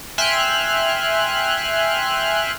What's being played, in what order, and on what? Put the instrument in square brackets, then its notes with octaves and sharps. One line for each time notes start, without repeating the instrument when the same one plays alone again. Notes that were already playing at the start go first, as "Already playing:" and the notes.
[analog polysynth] E5 G5 G#5 C6 F6 F#6